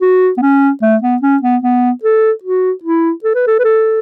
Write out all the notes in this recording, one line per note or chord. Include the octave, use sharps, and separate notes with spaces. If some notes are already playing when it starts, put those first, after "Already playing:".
F#4
B3
C#4
A3
B3
C#4
B3
B3
A4
F#4
E4
A4
B4
A4
B4
A4